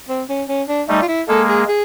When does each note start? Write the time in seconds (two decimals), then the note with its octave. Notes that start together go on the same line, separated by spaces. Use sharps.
0.09 C4
0.29 C#4
0.49 C#4
0.68 D4
0.88 G3 A3 D#4
1.02 F4
1.08 E4
1.28 G#3 A#3 A4
1.49 G#4
1.68 G#4